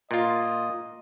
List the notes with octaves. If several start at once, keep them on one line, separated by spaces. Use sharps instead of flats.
A#2 F4 D#5